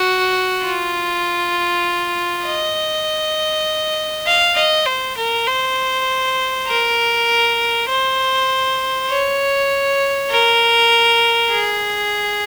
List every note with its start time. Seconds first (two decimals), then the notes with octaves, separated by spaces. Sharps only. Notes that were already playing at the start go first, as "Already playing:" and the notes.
Already playing: F#4
0.64 F4
2.45 D#5
4.26 F5
4.56 D#5
4.86 C5
5.17 A#4
5.47 C5
6.67 A#4
7.89 C5
9.09 C#5
10.30 A#4
11.50 G#4